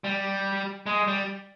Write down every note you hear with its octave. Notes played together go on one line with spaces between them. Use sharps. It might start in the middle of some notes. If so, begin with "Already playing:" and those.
G3
G#3
G3